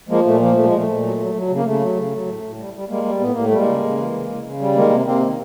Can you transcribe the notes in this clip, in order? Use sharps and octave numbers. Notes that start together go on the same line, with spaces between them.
F3 G#3 A#3
A#2 A3
F3 A#3
A#2 A3
G#3
A#2 A3
A#2
F#3
F#3
F#3
C#3
A#3
C#3 A3
F#3
C#3
F#3
A2
A2
G3
G3
G3 G#3 A#3
G3
A2 B3
A2 A#3
A3
G3
G#3 A#3
C#3
C#3
E3
C#3
C#3
C#3
G3
D#3 G#3 A#3
C3
C3 A#3 C4
D#3